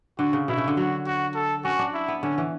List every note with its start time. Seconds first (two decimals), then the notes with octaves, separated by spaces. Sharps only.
0.19 D3 F#4
0.33 C#3
0.48 B2 E4
0.57 C#3
0.68 D3
0.77 F#3 F#4
1.07 F#4
1.35 A4
1.65 C#4 F#4
1.79 D4
1.94 E4
2.08 B3
2.23 D3 C#4
2.38 E3